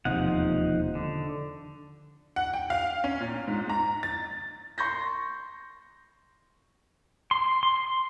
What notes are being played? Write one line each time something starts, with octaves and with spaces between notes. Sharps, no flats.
E1 D#2 C3 F3 D#4 F#5
D3
F#5
G5
F5
C#4
A#2
G#2
A#5
A6
C6 C#6 G6 A#6
C6
C6